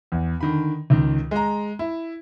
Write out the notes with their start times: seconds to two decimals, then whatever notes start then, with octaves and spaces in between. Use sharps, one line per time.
0.12 E2
0.41 D3 D#3 B5
0.90 C#2 D#3
1.31 G#3 A#5
1.79 E4